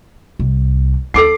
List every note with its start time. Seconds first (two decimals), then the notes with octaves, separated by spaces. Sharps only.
0.39 C2
1.14 D#2 A4 D6 C7